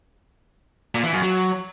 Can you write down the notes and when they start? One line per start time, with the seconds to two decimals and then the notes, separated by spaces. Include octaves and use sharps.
0.95 A#2
1.04 E3
1.13 F#2
1.22 F#3